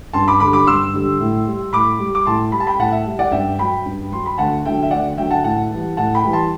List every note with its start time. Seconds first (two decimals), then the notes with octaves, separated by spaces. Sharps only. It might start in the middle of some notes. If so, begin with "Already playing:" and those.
0.13 G2 A5 C6
0.28 B5 D6
0.40 D3 B5 D6
0.45 G3
0.53 B5 D6
0.67 G2 C6 E6
0.93 D3 G3
1.20 A2
1.47 G3
1.73 A2 B5 D6
1.99 G3
2.15 D6
2.26 A2 A5 C6
2.52 G3 B5
2.60 A5
2.67 G5 B5
2.79 A2 F#5 A5
2.92 E5
3.06 G3
3.19 D5 F#5
3.32 G2 E5 G5
3.59 F#3 G5 B5
3.86 G2
4.12 F#3 C6
4.26 B5
4.38 D2 F#5 A5
4.65 D3 F#3 E5 G5
4.83 E5
4.91 D2 D5 F#5
5.17 D3 F#3 E5 G5
5.31 F#5 A5
5.44 A2 F#5 A5
5.70 E3 G3
5.97 A2 F#5 A5
6.15 G5 B5
6.24 E3 G3
6.33 A5 C6